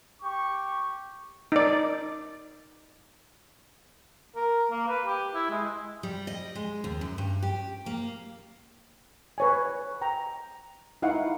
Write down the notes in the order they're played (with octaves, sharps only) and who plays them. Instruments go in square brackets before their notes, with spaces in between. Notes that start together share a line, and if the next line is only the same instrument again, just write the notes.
[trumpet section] G4 C#6
[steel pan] D#4 D5
[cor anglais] A#4
A#3
B4
G4
E4
G#3
[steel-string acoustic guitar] G3
D#5
G#3
D#2
F#2
G2
G4
A#3
[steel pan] B4 C#5 G#5
G5 A#5
D#4 E4 F5 F#5